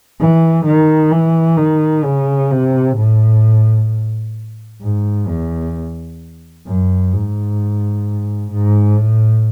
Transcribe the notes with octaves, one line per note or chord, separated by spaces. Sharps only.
E3
D#3
E3
D#3
C#3
C3
A2
G#2
E2
F#2
G#2
G#2
A2